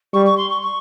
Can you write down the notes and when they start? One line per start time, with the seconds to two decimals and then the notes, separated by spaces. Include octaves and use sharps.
0.13 G3 C#6
0.26 C#6
0.37 C6
0.49 C#6
0.62 C#6